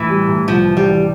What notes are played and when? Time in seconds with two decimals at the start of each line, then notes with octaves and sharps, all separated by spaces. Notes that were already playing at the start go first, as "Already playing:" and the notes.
Already playing: A2 E3
0.09 G3
0.28 A2
0.48 C2 F3
0.68 E3
0.77 G3
0.87 E3